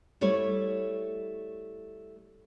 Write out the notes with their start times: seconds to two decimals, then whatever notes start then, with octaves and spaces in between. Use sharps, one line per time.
0.21 G3 A3 E4 C#5